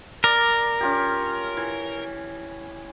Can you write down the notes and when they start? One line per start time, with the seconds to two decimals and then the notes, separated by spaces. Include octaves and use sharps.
0.24 A#4 D5
0.80 C#4 F4 G4
1.57 E3